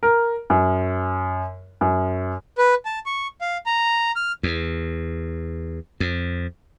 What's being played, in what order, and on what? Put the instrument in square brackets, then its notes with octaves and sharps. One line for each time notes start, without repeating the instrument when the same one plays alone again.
[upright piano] A#4
F#2
F#2
[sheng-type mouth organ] B4
A5
C#6
F5
A#5
F6
[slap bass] E2
F2